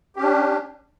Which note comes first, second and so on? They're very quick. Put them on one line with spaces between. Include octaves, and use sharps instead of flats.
G4 C#4 D4